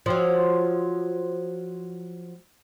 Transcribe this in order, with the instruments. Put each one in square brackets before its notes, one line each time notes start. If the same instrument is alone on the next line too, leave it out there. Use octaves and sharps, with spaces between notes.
[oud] F3 F#3